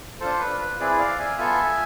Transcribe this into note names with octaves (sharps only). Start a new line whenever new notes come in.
D4 F4 A4 C5
B4
B4
C4 E4 G#4 B4 D5
D5 F5
E5 G#5
B3 F4 A4 E5 G#5